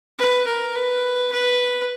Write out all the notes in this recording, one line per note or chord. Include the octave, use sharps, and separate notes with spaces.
B4
A#4
B4
B4